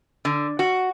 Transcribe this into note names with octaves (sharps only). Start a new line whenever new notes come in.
D3
F#4